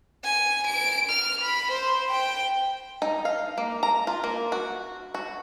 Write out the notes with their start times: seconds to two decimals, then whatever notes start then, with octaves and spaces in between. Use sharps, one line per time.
0.24 G#5
0.67 D7
1.10 F6
1.41 B5
1.71 C5
2.11 G5
3.02 D#4
3.25 F5
3.58 A#3
3.83 A#5
4.07 F4
4.24 A#3
4.52 F#4
5.14 F#4